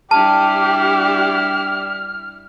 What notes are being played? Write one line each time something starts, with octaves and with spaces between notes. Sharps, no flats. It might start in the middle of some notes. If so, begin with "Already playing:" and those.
G3 D4 E4 G4 A5 F6